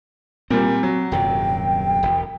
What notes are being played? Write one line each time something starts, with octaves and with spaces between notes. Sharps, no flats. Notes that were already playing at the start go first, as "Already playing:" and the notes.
A#2 G3 C4
F#3
D#1 F#2 C3 G5
E1